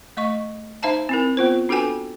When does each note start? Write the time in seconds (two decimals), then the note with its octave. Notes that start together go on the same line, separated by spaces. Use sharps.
0.17 A3 D#5 C#6
0.83 D#4 C5 E5 F5 A5 A#5
1.09 C4 E4 A#4
1.37 B3 F4 C5
1.69 D4 F#4 A4 B4 G5 G#5